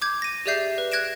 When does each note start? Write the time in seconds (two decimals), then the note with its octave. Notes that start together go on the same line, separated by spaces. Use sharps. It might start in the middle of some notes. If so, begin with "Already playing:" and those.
0.02 D6 G6 G#6
0.22 A#6 D#7
0.46 G4 G#4 D5 E5 G6 C7
0.78 B4
0.92 F#6 G#6 A#6 D7 E7